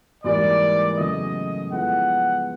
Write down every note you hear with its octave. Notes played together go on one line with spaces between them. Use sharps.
G#2 E3 G3 A#3 D5
E2 C#3 F#3 A3 D#5
F3 G#3 B3 E4 A4 F#5